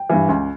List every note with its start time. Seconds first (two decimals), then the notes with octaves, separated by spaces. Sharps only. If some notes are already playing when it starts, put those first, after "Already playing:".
Already playing: G5
0.10 G2 E3
0.29 C#2